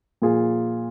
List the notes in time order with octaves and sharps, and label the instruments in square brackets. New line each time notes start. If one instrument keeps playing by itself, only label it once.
[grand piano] A#2 F3 A#3 F4 G#4